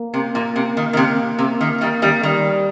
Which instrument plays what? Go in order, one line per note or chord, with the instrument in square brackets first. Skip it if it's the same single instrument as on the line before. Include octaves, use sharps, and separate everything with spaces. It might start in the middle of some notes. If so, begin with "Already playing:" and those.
Already playing: [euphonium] A#3
[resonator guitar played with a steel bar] C3
A#2
C3
D#3
D#3
C3
C3
D#3
D#3 G3
D#3 G3
[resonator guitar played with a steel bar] D#3 [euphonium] G3